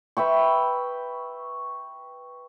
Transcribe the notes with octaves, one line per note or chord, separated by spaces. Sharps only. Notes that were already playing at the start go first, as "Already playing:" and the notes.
B4 E5 G5 C#6